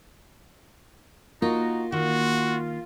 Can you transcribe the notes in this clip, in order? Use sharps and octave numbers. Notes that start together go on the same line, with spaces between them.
A#3 D#4 F4 F#4
D#3 F4 F#4